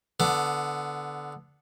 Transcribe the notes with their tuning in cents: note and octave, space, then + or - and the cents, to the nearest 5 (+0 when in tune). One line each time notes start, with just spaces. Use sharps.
D3 -10 B3 +0 D6 +20